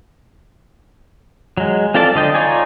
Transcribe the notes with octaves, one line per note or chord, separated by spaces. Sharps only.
F#3 G#3
C4 F4 A4 D5 A5
D3 D#5 G5
D#4 F4 C#5 D5 G#5